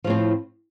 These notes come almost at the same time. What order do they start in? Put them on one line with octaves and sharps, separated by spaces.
F3 A2 C4